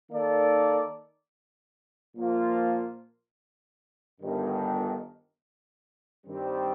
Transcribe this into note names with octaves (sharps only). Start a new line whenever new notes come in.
D#3 A#3 D#4 A4 D5
A#2 F3 A#3 F4
G1 G2 D#3
G2 D#3 G3 C4